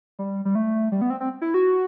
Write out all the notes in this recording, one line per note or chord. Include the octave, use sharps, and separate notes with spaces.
G3
G3
A3
G3
B3
C4
C4
E4
F#4